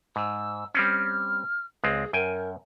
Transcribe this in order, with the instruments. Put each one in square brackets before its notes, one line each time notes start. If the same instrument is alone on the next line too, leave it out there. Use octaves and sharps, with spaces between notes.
[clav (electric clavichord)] G#2 [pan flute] E6
[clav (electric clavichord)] G3 C4 C#4 [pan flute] F6
[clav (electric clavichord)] C#2 G#3 C4 [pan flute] G#4
[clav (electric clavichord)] F#2 G5 G#5 [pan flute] A#4